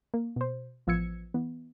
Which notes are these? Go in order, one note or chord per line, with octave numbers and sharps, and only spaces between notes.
A#3
B2 C5
A1 F3 B3 E6 G#6 C#7
E3 B3